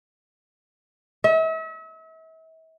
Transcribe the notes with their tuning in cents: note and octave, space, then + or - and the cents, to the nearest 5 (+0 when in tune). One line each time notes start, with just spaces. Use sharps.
E5 -40